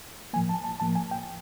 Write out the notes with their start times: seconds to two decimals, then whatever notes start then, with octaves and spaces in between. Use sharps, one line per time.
0.33 A2 F3 A#3 G#5
0.49 A5
0.64 A5
0.80 A2 F3 A#3 A5
0.95 G#5
1.11 G5